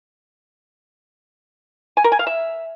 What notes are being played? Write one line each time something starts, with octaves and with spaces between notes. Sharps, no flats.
G#5
A#4
G#5
F5
E5